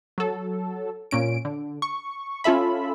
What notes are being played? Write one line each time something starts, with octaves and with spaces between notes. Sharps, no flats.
F#3 A4
A#2 C#4 D7
D3
C#6
C#4 F4 A4 E5 B5